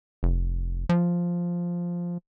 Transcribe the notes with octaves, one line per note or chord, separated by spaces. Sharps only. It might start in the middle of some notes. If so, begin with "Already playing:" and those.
F1
F3